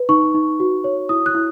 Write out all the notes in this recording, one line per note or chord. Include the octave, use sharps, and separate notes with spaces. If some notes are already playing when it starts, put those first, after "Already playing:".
Already playing: B4
D#4 C#6
D#4
F#4
C#5
E4 D#6
F#6
E4